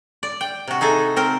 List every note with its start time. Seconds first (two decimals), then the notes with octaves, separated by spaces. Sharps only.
0.23 D5
0.41 G5
0.68 C3 F#4
0.81 D#4 G#4 A4 E5
1.16 C4 A#4 C5